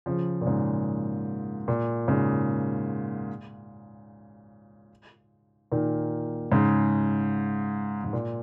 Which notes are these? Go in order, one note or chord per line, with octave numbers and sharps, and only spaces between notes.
C#3 F3
A#2
G#2 C#3
A#2
G#2 C#3
A#2 D#3
G#2 C#3
G#2
A#2